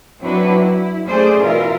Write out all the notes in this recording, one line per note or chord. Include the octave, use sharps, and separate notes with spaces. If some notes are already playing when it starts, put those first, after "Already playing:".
F#3 C4 D4 E4 F#4 B4
E4
A3 C#4 G#4 C5 D5
B2 E3 E4 F4 A#4 E5